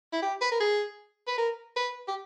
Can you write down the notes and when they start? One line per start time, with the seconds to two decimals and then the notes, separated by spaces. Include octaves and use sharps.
0.13 E4
0.22 G4
0.41 B4
0.52 A#4
0.60 G#4
1.27 B4
1.38 A#4
1.76 B4
2.08 G4